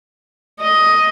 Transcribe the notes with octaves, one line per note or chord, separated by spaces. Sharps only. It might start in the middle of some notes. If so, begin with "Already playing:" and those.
D#5